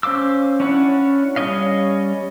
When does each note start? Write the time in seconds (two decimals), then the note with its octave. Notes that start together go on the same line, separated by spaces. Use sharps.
0.03 C#4 C5 F5 D6 E6
0.60 C#4 D4 E4 C#5 F#5
1.36 G3 C#4 C#5 D#5 F5